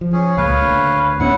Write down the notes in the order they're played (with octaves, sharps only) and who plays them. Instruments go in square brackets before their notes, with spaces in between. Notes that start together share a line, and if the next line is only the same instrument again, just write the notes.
[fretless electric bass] F3
[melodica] C#4 G#4
[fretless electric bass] C#2 A#2 [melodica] B4 C#5 F5
[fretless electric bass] D2
[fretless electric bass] G#2 B3 C#4 [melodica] E4 F#5